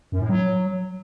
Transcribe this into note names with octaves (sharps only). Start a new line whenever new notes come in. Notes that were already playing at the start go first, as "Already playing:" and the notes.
F#2
A2
F#3